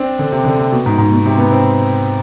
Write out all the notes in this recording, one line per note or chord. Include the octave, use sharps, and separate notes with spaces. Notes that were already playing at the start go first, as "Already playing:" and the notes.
Already playing: C4 D4
D3
C3
D3
C3
B2
G#2
G#2
B2
C3
B3
C4